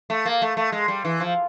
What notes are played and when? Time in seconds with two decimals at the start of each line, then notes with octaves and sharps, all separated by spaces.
0.10 A3
0.26 A#3
0.42 A3
0.57 A3
0.72 G#3
0.88 G3
1.05 E3
1.20 F3